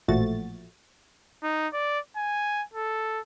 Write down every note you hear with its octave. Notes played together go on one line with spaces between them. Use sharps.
A1 A#2 F3 A3 F#4 A6
D#4
D5
G#5
A4